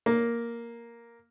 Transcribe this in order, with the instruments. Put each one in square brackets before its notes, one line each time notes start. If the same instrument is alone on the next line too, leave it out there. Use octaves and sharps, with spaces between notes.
[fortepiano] A#3